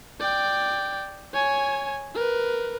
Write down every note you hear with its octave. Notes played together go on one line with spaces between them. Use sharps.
D5 G5
C#5 G#5
A#4 B4